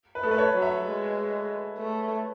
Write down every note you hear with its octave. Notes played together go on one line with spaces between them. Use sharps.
B4
A3 A4
B4
C#5
F#3
E5
G#3
A3